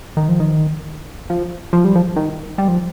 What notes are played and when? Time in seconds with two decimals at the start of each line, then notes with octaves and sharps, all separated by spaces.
0.17 D#3
0.28 F3
0.40 D#3
1.30 F3
1.73 F3
1.84 G3
1.95 F3
2.16 D#3
2.58 G3
2.68 F3